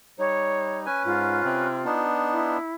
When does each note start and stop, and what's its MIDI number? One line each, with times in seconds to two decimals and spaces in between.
0.19 0.86 55
0.19 0.86 63
0.19 0.79 73
0.86 1.68 61
0.86 1.68 71
0.86 1.02 80
1.05 1.41 44
1.05 2.01 65
1.44 1.84 48
1.44 1.84 60
1.85 2.58 59
1.85 2.58 62
1.85 2.57 63
2.32 2.75 64